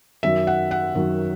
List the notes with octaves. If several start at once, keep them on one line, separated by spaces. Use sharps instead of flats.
F#2 D#3 F#3 E5
F#5
F#5
F#2 D#3 F#3